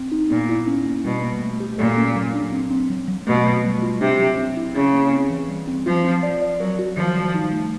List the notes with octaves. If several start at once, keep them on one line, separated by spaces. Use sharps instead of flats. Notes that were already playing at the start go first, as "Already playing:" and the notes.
Already playing: C4
D#4
A#2 B3
E4
C#4
A#3
B2 G3
A#3
A3
G4
A#2 A4
C#4
F#3
D4
C4
C4
F#3
F#3
B2 A3
A3
G3
F4
C3 D4
F#3
C4
E4
C#3 C#4
A#3
C4
E3
G3
C4
F3 F4
C4
D5
D5
F#3 A#4
F#4
D#3 F3
G3
D#4
A3